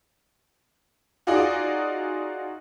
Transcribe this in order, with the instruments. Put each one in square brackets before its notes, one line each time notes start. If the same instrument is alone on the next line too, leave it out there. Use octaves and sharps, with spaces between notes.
[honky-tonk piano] D#4 F4 F#4 G#4 D5 D#5